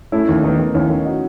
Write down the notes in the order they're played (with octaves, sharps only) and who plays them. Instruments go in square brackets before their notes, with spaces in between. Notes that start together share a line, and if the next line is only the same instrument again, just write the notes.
[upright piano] A3 C#4 [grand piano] E4
[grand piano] D#2
[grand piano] D#3 [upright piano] B3 D#4
[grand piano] D#3
[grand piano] D#2 [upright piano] C#4 E4
[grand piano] D#3
[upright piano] D#4 F#4